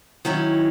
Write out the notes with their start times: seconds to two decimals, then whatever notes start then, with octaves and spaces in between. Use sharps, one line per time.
0.25 D#3 F#3 C#4 E4